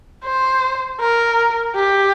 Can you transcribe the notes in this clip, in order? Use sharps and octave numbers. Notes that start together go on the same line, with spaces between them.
C5
A#4
G4